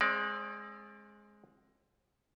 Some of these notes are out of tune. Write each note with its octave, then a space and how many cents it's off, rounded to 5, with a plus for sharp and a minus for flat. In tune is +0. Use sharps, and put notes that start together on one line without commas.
G#3 +0 C4 +40 D5 +0